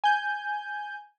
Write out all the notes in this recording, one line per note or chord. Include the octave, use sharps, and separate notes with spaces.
G#5 G6